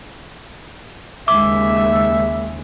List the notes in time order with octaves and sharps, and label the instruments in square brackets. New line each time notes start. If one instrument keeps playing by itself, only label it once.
[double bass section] D#2 C#3 G#3 [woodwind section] E5 [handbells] D6